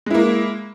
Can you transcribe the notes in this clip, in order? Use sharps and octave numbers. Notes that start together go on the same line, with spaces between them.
G#3 A#3 E4